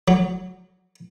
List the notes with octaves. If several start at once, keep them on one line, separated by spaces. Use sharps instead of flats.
F#3